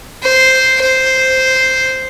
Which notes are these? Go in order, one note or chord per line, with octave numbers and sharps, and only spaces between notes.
C5
C5